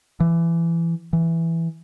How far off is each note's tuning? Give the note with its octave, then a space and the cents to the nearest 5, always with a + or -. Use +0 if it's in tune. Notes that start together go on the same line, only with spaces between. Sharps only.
E3 +20
E3 +5